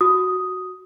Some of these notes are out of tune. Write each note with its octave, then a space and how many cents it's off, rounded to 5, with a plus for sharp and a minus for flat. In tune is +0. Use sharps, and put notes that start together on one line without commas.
F#4 +0 D#6 +0